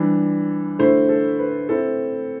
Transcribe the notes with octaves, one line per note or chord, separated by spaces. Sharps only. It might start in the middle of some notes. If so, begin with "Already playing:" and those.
Already playing: E3 G3 D4
D3 A3 E4 C5
A4
B4
C4 E4 A4